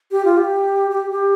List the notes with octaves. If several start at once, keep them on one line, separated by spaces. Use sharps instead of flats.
G4
F4
G4
G4
G4